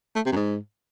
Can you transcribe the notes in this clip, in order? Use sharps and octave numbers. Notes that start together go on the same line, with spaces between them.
A3
C3
F#2
G#2